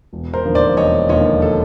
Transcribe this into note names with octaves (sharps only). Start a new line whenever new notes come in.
E1
A#4 C5
D#2 D3 F3
C5 D5
E1 C#5 D#5
D#2 D3 F3 C#5 D#5
A4